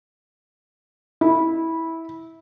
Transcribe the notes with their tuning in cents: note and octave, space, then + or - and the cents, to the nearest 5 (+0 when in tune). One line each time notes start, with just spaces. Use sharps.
E4 -15